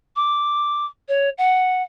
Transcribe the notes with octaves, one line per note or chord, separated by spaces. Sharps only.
D6
C#5
F#5